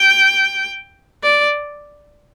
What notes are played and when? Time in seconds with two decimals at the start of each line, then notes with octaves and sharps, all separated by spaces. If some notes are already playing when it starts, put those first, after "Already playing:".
Already playing: G5
1.23 D5